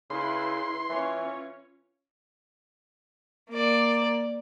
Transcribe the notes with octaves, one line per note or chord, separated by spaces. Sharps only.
C#3 E4 B4 C6
E3 C#4 F4 C#5
A#3 D5